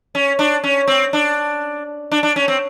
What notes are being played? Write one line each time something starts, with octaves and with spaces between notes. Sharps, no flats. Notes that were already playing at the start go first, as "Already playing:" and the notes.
C#4
D4
C#4
C4
D4
D4
D4
C#4
C4